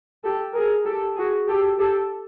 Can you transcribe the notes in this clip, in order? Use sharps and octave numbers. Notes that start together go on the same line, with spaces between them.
G4 A4
G#4 A#4
G4 A4
F#4 G#4
G4 A4
G4 A4